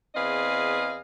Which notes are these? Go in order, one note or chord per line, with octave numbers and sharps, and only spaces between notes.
E2 C4 G#4 B4 D#5 F5